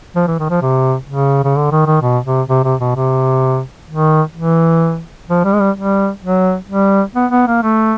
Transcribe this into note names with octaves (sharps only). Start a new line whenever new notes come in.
F3
E3
D#3
F3
C3
C#3
C#3
D3
D#3
D#3
B2
C3
C3
C3
B2
C3
D#3
E3
F3
G3
G#3
G3
G3
F#3
G3
B3
B3
A#3
A3